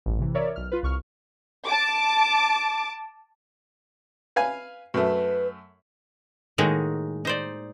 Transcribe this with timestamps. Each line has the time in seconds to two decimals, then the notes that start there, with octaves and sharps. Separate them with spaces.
0.06 A1 G2
0.19 C3 E3
0.34 A#4 C#5 D5 E5
0.56 B1 F6
0.72 F4 B4
0.83 C2 C#6 F6
1.66 A5 D6
4.36 B4 F5 G#5
4.94 F#2 A3 B4
6.58 A2 D#3 G#3 A#3 D#4 F#4
7.25 D#4 C5 D5